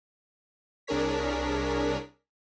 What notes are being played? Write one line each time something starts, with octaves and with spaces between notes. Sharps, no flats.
C2 D4 G#4 A#4 C#5 B6